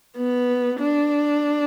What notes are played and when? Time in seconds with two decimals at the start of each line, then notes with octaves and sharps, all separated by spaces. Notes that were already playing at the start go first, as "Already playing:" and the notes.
0.16 B3
0.80 D4